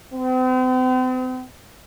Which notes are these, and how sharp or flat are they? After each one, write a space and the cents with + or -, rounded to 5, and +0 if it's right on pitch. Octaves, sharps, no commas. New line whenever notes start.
C4 -40